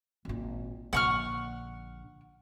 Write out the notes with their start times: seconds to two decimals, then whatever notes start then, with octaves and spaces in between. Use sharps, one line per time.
0.25 G#1 A#2
0.93 A#1 D3 F#5 C#6 F6